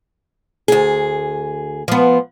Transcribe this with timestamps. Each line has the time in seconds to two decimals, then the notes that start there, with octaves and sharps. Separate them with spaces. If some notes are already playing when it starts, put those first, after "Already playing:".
0.68 D2 G#4
1.88 F3 B3